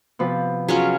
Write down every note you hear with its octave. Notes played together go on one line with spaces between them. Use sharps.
C3 F3 B3
F#3 C#4 F4 G#4